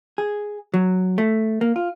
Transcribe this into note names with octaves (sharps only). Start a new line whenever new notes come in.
G#4
F#3
A3
A#3
F4